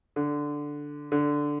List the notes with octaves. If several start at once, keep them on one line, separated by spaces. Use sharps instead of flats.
D3
D3